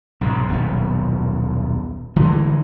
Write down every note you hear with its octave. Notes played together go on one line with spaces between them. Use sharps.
B1 G#2 C3
D#1 B1 F#2 B3
D3 E3 G#3